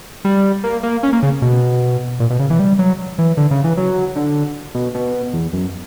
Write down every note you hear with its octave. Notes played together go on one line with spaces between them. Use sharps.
G3
A#3
A#3
C#4
A#3
C#3
B2
A#2
B2
C#3
E3
G3
F#3
E3
D3
C#3
E3
F#3
D3
B2
B2
E2
F#2